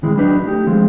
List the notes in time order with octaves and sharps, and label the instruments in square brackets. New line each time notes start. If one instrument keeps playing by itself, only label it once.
[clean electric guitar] A2 C3 D#3 E3 G#3
F#3 D4 D#4 B4
A3 D#4 G4
F3 G#3 C4